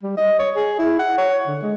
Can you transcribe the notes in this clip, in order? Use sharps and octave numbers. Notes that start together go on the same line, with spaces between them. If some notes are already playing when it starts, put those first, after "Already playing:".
G3
D#5
C#5
G#4
E4
F#5
C#5
D3
G#3